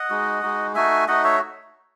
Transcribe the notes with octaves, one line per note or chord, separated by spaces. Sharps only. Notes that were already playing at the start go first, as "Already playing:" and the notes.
Already playing: D#5 F#5
G#3 D#4 F#4
G#3 D#4 F#4
A3 D#4 F#4 E5 G#5
A3 D#4 F#4 D#5 F#5
C#5 E5